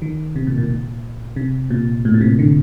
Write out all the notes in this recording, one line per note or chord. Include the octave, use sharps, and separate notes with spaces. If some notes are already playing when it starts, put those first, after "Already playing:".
D#3
C3
A#2
A#2
A#2
C3
A#2
A2
A#2
C3
D3